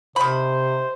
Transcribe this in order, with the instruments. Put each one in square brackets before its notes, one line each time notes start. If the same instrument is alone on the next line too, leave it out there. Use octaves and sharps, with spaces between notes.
[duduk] C3 [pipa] D#3 B5 [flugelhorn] C5